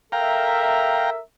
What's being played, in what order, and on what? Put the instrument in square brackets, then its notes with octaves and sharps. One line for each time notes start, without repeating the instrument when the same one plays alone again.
[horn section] A4 A#4 E5 [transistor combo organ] F5 G5 A#5